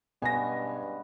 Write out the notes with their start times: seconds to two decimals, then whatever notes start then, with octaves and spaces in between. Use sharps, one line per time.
0.22 G2 B2 G#3 B3 C#4 G#5 A#6